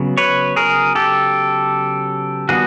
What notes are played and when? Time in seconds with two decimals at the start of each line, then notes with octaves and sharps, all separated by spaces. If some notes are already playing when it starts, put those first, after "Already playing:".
Already playing: C#3 F#3 B3
0.18 B4 C#5
0.56 G#4 A#4
0.95 G4 A4
2.49 D#3 G3 B3 F#4 G#4